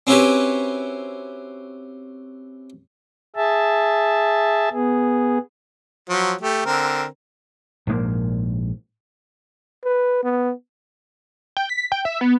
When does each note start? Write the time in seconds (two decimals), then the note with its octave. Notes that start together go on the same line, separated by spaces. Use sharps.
0.07 C4 C#4 E4 F#4 G4 B4
3.36 G#4 E5 A5
4.73 B3 G#4
6.10 F3 F#3
6.41 A3 G4
6.66 D3 C4 A#4
7.87 A#1 G#2 C#3 A#3
9.84 B4
10.24 B3
11.57 G5
11.69 B6
11.92 G5
12.05 E5
12.21 B3